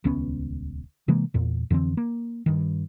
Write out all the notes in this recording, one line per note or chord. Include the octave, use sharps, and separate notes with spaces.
D#1 C#2 B3 C#4
C3 E3 G#3 A#3
E2 A#2
F2 D3 E3 C4
A#3
G2 D#3